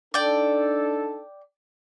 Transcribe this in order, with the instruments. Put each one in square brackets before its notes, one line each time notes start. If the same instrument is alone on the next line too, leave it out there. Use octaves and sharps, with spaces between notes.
[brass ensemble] D4 D#4 A4 [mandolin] D5 G5